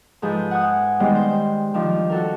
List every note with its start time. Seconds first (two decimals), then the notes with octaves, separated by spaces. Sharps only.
0.22 G#2 F3 G#4 A4 B4 G6
0.51 F#5 G#5 D#6
1.00 D#3 G3 G#3 B3 C5
1.15 C5
1.74 D#3 F3 D4
2.10 F#4 A4 A#4